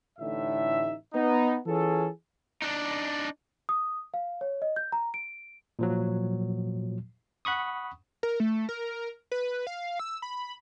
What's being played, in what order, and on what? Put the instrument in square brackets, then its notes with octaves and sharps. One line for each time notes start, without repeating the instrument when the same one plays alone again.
[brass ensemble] A1 A2 D3 D#4 E5
B3 D#4
E3 C#4 F4 G#4 A4
[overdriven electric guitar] D4 D#4
[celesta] D#6
F5
C#5
D#5
G6
A#5
D7
[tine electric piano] A#2 F3 F#3
F#5 B5 C#6 D#6
[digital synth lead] A#4
A3
A#4
B4
F5
E6
B5